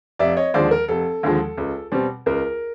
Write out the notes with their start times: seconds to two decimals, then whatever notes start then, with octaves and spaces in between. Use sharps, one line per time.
0.19 F1 D5 E5
0.37 C#5 D#5
0.54 D#2 D3 F3 G#3 C5 D5
0.71 A#4
0.88 F1 A4
1.23 D#2 D3 F3 G#3
1.57 C#2
1.92 B2 G3 C4
2.26 C#2 A#4